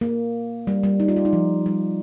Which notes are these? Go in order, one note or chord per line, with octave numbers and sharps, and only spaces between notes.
A#3
G3
G3
D#4
F4
G4
D#4
F3
G3